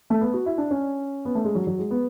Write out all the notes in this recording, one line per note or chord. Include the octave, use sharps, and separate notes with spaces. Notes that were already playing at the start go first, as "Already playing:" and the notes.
A3
B3
F#4
E4
D4
C#4
B3
A3
G#3
F#3
F#3
G#3
B3